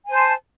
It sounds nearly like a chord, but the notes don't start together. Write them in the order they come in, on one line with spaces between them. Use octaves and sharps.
G#5 C5 A5